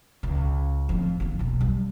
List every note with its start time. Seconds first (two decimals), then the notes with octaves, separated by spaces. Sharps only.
0.23 C#2
0.89 F2 A2
1.20 A1 F2
1.39 F1 B1
1.61 G3